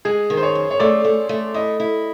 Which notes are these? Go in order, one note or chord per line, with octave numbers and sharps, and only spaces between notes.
G#3 G#4
D#3
C5
C#5
F#2
C#5
A3 D5
A3
A3
E4 D#5
E4